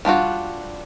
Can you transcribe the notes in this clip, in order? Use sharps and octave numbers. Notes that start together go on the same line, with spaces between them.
G3 D4 F4 F#4